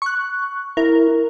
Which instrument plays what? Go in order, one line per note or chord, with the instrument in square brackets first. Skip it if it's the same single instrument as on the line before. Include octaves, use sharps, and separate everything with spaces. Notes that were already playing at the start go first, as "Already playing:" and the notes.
[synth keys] C#6 F#6
[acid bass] E4 [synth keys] A#4